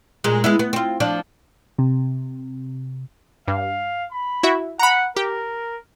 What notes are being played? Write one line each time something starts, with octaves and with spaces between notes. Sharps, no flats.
A#2 G#3
G#3 B3 E4
B3
C4 F4
F3 D4
C3
G2 F5
B5
E4 F#4 E5
F#5 A#5 B5
G4 A#4